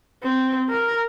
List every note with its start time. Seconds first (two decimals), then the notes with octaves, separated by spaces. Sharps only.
0.23 C4
0.70 A#4